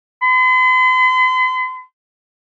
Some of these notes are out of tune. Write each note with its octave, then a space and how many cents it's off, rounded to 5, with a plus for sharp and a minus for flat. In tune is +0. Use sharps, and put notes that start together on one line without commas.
C6 -45